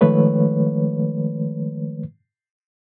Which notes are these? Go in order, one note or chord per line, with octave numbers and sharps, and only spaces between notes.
D#3 F3 G#3 A3 B4 C#5